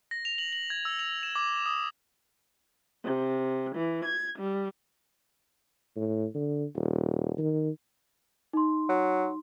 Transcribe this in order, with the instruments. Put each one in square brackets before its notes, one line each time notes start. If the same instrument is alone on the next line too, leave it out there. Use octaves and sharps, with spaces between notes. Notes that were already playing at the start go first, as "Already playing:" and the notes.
[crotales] A#6
F7
F#7
F#7
G#6
E6
F7
E7
D6
D#6
[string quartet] C3
E3
G#6
G3
[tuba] A2
D3
D#1
D#3
[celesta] D#4 C6
[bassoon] F#3